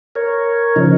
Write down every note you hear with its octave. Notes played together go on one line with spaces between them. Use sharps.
A#4 C#5
C#3 F3 D#4